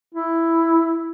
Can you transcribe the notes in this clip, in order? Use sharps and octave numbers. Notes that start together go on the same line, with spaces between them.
E4